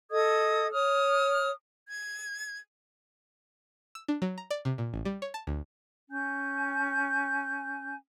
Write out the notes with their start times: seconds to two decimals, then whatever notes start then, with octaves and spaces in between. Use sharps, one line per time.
0.11 A4 D#5 D#6 G#6
0.71 C#5 D#6 F6
1.88 G#6
3.95 E6
4.08 D4
4.22 F#3
4.38 A#5
4.51 D5
4.65 C3
4.78 A#2
4.94 A1
5.05 G3
5.22 C#5
5.34 A5
5.47 D2
6.10 C#4 G#5 G6